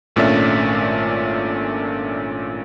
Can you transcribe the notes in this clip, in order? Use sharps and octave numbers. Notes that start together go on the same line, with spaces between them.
G#1 A#2 A3 C#4 D4 E5